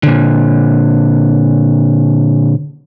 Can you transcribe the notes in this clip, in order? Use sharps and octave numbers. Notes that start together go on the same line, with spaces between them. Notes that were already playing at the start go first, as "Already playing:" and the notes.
A#2 D3